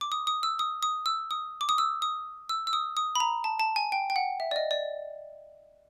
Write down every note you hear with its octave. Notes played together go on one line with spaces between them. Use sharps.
D6
D#6
D#6
E6
D#6
D#6
E6
D#6
D6
D#6
E6
D#6
E6
E6
D#6
D#6
B5
A#5
A5
A5
G#5
G5
G5
F#5
E5
D5
D#5
D5